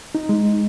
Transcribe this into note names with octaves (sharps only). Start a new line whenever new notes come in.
D#4
G#3